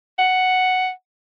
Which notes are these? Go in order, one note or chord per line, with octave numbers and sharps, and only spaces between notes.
F#5